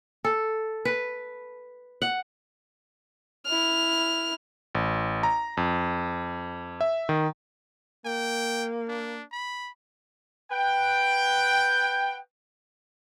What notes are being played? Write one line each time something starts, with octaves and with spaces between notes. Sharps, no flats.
A4
B4
F#5
E4 F6
A1
A#5
F2
E5
D#3
A#3 G5
D4
B5
B4 F#5 G5